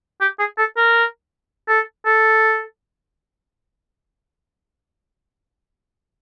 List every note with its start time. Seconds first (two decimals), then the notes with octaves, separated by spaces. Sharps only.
0.21 G4
0.39 G#4
0.58 A4
0.76 A#4
1.68 A4
2.06 A4